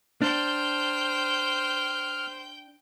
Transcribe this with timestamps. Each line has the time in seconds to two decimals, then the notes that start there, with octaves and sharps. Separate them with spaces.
0.22 D4 C5 G5 F6 G6